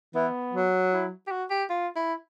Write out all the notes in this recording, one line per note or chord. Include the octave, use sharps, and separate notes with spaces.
E3 B3
F#3
E4
G4
F#4
G4
F4
E4